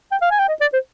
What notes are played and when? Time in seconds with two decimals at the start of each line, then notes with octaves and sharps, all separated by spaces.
0.11 G5
0.21 F5
0.31 G#5
0.39 G5
0.48 D#5
0.61 D5
0.73 C5